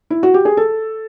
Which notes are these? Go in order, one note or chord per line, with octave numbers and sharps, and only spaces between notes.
E4
F#4
G4
G#4
A4